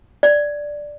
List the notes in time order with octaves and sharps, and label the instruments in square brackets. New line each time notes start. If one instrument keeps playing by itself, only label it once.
[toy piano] D5